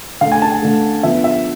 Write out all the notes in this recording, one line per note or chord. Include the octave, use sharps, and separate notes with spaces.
D3 A3 F5
G#5
A5
G#5
D3 A3
D3 F3 B3 E5
E5